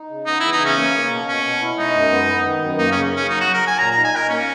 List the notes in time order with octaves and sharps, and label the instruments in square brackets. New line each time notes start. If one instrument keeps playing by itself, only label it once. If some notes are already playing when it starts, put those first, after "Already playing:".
Already playing: [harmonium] D#4
C#3
[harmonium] B3 [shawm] D#4
[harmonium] E3 [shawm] E4
[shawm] D#4
[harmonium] C#3 [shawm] C#4
[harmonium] A#3
A#3
B2
[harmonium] B2 [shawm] C#4
[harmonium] B2
E4
[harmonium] G#3 [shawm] D#4
[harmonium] F#2
B3
B3
D#3
F#2
[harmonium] A#3 [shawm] D#4
[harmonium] C#3 [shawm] C#4
[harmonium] C#3 [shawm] C#4
[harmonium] F#3 [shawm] D#4
[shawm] F#4
[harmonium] F#3
[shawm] A#4
[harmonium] F#3 [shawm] G#5
[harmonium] A#2 [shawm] A#5
[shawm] A#5
[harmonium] D#4
[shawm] G#5
[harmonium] D#4 [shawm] A#4
[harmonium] A#3 [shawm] C#4